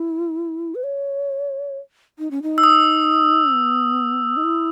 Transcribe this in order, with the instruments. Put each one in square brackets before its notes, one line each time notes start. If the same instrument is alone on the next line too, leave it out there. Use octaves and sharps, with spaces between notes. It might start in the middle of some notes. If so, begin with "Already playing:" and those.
Already playing: [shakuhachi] E4
B4
C#5
D#4
C#4
D#4
[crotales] E6
D#6
[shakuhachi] B3
D#4
E4